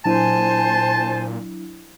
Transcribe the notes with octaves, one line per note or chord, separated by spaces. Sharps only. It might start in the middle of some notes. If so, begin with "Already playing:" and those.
A#2 F#3 D4 E4 C5 G#5 A5